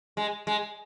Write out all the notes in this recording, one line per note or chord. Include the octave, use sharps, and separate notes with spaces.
G#3
G#3